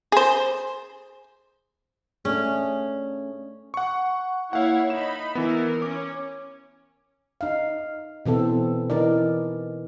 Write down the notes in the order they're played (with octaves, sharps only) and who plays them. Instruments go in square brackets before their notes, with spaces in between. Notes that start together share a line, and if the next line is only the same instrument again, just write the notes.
[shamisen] G#4 C5
[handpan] A3 D4 G#4 [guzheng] C#4
[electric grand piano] F#5 C#6
[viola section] A#3 E4 C#5 [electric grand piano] F5 F#5
[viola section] D#4 B5 [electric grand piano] E7
[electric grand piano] E3 B3 [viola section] E4 A#4
[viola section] C#4 [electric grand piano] D6
[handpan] D#4 F5
B2 E3 C4 A4
E3 D#4 A#4 D5